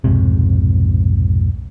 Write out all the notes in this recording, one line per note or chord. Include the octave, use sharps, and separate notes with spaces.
B1 F2 G#2 C3